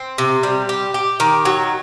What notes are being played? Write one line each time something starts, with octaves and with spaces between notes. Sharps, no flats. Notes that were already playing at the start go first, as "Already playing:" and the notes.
Already playing: C4
C3
G3
G4
G4
D#3
F#3